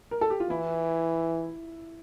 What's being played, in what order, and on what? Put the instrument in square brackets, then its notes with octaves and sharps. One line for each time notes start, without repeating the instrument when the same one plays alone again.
[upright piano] A#4
A4
G4
F4
[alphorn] E3 [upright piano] E4